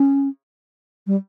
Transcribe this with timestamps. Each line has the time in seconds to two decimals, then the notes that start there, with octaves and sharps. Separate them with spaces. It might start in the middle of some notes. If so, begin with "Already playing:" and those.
Already playing: C#4
1.07 G3